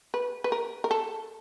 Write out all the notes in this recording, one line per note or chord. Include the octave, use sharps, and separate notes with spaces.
B4
B4
A#4
A#4
A4